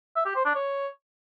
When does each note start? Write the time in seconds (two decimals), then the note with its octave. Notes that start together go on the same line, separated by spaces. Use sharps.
0.16 E5
0.26 G4
0.36 C5
0.46 D4
0.55 C#5